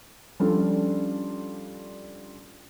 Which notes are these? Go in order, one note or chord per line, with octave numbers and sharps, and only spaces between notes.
F3 G3 C#4 D4 F4 A4